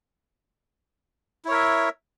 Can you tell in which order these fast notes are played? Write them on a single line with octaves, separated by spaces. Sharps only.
E4 C#5 A#4 E5